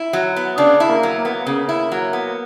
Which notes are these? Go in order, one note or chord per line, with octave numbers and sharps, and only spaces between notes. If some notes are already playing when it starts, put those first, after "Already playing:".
Already playing: E4
F#3
B3
C#3 D4
E4
A#3
F#3
A#3
B3
C#3 A#3
E4
F#3
B3